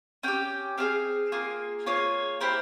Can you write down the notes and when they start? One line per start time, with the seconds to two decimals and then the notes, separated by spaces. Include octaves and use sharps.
0.23 C#4 G4 G5
0.78 C4 F4 G#4 F5
1.32 A#3 F4 G#4
1.86 A#3 F4 G#4 C#5
2.41 A#3 E4 G4 C5